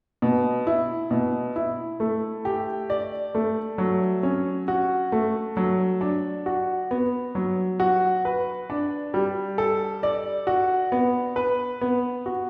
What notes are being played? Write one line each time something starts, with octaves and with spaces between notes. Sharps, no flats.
B2
E4
B2
E4
A3
G4
D5
A3
F#3
C#4
F#4
A3
F#3
D4
F#4
B3
F#3
F#4
B4
D4
G3
A4
D5
F#4
B3
B4
B3
F#4